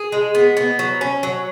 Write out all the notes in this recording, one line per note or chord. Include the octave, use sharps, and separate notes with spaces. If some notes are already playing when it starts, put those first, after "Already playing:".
Already playing: G#4
G#3
B3
B3
F#3
C#4
F#3